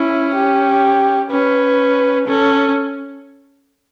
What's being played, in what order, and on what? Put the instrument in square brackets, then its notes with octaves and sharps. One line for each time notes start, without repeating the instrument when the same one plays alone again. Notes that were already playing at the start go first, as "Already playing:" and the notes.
Already playing: [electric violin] C#4 [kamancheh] E4
[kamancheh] G4
[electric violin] C#4 [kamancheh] B4
[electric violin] C#4 [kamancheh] A4